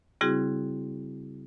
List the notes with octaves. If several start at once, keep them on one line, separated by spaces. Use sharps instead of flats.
C#3 G3 C4 E4 F#4 G#4